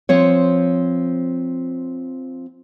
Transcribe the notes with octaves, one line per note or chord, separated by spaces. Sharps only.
F3 C4 C#5